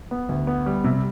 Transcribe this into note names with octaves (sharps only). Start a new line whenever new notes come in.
B3
D2
B3
G3
C3